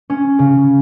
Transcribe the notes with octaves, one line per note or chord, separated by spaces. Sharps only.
C#4
C#3